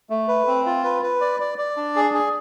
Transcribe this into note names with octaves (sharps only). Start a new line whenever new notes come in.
A3
B4
C4
F4
B4
B4
D5
D5
D5
D4
G#4
G#4